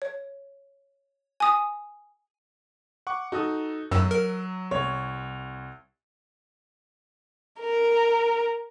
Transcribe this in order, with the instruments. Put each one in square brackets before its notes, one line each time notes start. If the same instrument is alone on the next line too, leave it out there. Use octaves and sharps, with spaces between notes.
[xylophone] C#5
G#5 D#6
[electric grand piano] F#5 C#6 D6
[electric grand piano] D#4 A4 D#6 [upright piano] F#4
[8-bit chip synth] F#2 [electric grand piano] F#3 [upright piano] E6
[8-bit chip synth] A#4
[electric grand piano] C2 [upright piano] C#5
[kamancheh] A#4